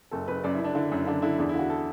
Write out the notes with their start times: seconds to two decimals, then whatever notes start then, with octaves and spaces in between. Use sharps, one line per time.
0.11 F#1 A4
0.28 F#1 B4
0.44 F#2 D5
0.55 E4
0.59 F#2
0.64 D4
0.75 D3 E4
0.92 F#2
1.07 D3 D4
1.22 D3 E4
1.39 E2 D4
1.49 E4
1.55 D3 F#4
1.70 A4